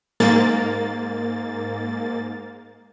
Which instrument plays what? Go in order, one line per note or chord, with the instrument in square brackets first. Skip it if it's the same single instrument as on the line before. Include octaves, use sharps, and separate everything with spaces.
[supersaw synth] G#2 A#3 A6